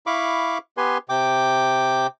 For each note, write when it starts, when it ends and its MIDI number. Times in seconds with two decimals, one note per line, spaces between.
0.07 0.58 64
0.07 0.58 77
0.07 0.58 83
0.07 0.58 85
0.07 0.58 86
0.77 0.98 59
0.77 0.98 67
0.77 0.98 71
0.77 0.98 80
0.77 0.98 84
1.09 2.07 48
1.09 2.07 79
1.09 2.07 86